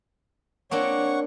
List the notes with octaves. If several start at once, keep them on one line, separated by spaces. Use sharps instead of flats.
A#3 C4 D4 C#5 F#5 C#6